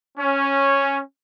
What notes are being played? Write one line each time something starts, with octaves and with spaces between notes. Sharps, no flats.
C#4